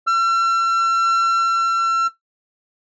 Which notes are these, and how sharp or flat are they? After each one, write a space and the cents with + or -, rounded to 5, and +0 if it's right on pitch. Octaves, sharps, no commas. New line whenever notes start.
E6 +45